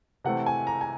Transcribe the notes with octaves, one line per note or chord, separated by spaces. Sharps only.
C3 E3 A3 C4 F#5
G#5
A#5
G#5